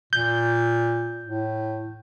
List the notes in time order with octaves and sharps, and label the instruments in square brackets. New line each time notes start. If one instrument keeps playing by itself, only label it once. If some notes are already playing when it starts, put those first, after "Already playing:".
[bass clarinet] A#2 [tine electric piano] G6
[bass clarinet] A2